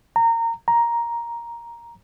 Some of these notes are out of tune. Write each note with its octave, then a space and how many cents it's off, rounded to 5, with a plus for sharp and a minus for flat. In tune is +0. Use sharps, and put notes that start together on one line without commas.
A#5 -25
A#5 +5